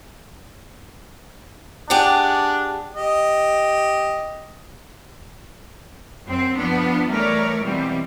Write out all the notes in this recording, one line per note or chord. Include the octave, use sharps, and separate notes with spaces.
D4 G4 G#4 F#5
G4 D#5
F#2 C4
F3 B3 D4
E3 G3 A3 A#4 C#5 D5
B2 E3 G3 C4